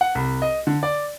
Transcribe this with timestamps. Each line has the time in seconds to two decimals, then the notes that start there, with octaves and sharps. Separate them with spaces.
0.01 F#5
0.15 C2
0.42 D#5
0.67 D3
0.83 D5